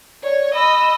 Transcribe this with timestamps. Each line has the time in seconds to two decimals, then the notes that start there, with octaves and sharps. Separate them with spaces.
0.24 C#5 D5
0.54 D#5 B5 E6